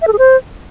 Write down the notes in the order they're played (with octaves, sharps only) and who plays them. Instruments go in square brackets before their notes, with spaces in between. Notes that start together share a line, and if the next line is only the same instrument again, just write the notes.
[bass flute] E5
A4
G#4
C5